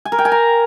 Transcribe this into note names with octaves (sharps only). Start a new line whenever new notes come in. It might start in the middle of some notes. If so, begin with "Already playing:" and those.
G#5
A#4
G5
G#5
A#5